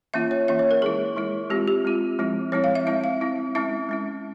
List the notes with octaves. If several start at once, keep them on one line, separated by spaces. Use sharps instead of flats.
E3 A#3 C#4 F4 E5
C#5
E3 A#3 C#4 F4 E5
C#5
A#4
E3 G#3 E4 G#4
E3 G#3 E4
G#3 C4 F4 G4
G4
G#3 C4 F4
F3 G#3 C4 E4
F3 G#3 C4 E4 C#5
F5
E5
G#3 C4 E4 E5
F5
G#3 C4 E4
G#3 C#4 E4 E5
G#3 C#4 E4